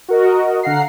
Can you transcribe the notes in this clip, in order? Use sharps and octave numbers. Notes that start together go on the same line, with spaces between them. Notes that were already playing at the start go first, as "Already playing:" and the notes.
F#4 A#4 D#5
D3 F5 F#5 A#5 C7